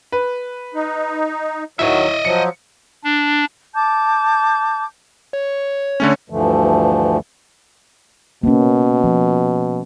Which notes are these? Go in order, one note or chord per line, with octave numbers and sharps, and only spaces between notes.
B4
D#4
D#3 F#3 E4 C#5 D#5 E5
F3 F#3 C#7
D4
A5 D6 G6
C#5
D3 A3 C#4
D2 G2 D3 E3 F3 A3
B2 A#3 C#4
F3